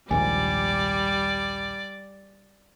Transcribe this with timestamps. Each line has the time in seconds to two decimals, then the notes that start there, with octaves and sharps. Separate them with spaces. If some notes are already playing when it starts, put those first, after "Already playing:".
0.11 A#1 D#2 G#2 G3 D5 G#5